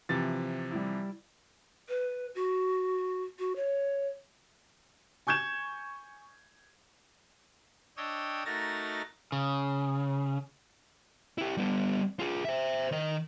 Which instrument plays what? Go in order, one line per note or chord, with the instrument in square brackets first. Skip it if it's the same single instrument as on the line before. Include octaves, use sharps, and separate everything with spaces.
[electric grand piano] C3 E3 F3 [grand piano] A6
[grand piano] G3 E4
[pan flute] B4
F#4
F#4
C#5
[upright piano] G#5 C#6 G6 G#6 E7
[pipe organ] D4 C#5 D#5 G5 D#6 E6
A3 D#4 F#4 A#4 A6 A#6
[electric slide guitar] C#3
[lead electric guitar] E4 G4
G3 B3
F4 G#4
C5 E5
D#3 D#5